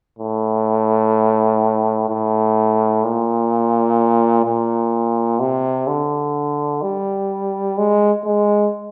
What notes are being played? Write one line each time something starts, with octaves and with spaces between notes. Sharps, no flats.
A2
A2
A#2
A#2
C3
D3
G3
G#3
G#3